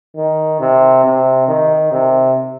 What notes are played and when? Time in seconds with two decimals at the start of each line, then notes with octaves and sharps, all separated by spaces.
0.17 D#3
0.60 C3
1.04 C3
1.48 D#3
1.92 C3